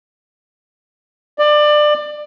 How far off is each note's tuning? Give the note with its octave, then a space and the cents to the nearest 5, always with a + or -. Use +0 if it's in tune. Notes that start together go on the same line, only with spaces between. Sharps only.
D5 +25